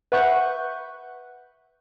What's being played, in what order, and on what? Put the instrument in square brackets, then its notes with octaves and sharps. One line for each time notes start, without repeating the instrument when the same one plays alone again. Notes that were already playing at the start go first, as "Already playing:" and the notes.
[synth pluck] B4 E5 F#5 C#6 F#6 G6